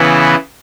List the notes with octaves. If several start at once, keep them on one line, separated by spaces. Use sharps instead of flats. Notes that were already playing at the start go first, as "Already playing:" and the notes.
Already playing: C#3 E3 B3 E4